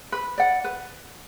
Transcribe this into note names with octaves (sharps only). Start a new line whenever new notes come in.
B4
D5 F#5
B4